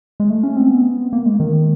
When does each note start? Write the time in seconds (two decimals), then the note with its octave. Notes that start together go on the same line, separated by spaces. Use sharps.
0.20 G#3
0.30 A3
0.43 C#4
0.56 C4
0.70 B3
1.13 A#3
1.26 G#3
1.40 D#3